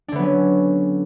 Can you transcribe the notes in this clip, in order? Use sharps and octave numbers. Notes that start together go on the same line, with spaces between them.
D3 F#3 B3 C#4 D4